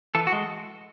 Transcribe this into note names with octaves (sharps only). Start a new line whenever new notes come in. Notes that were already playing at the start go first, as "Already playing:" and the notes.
E3 A4
F#4
G#3